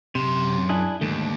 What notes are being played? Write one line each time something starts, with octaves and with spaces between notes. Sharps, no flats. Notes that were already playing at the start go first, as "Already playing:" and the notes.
F#2 C3 C6
D4 E4 G#4
D#2 G#2 D3 A3